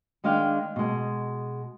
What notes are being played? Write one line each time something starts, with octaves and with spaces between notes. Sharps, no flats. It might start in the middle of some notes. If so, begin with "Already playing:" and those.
D#3 G#3 D4 F5 G5
B2 G#3